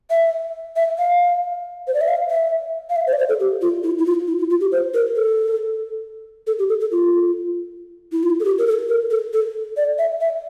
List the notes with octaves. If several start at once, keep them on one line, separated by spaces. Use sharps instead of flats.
E5
E5
F5
C5
D5
E5
F5
E5
F5
E5
C5
D5
C5
A4
G4
F4
E4
E4
F4
E4
F4
F4
G4
C5
A#4
A4
A4
G4
A4
A4
F4
E4
F4
A4
G4
A#4
A4
A#4
A4
A4
D5
E5
E5